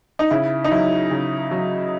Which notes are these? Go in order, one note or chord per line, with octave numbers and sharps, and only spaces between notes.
D#4
C#3 E4
D#4
F#3 E4
C#3
F#3